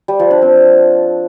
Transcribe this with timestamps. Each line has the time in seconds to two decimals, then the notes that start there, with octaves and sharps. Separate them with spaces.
0.08 G3
0.19 F3
0.31 D4
0.42 C4